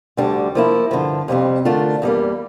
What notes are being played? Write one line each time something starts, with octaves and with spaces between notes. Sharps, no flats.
D2 D3 G3 D4
F3 A#3 E4
G2 D3 F3
F2 C3 G3 C4
D3 A3 D4 F4 A#4
E2 E3 G3 A#3